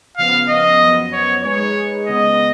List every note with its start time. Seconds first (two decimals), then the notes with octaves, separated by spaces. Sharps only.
0.17 C#3 F3 B3 F5
0.49 D#5
0.81 F#2 F3 B3
1.13 C#5
1.44 G#3 D#4 G#4 B4 C#5
2.07 C#3 G#3 B3 D#5